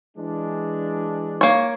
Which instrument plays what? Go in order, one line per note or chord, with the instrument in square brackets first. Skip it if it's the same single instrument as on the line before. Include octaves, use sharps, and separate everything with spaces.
[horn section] E3 G#3 D4
[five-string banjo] A#3 C#5